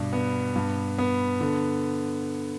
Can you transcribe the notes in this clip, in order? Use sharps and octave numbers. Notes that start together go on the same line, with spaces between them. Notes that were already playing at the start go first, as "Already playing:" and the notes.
Already playing: G2 B2 D4
B3
G2
B3
D3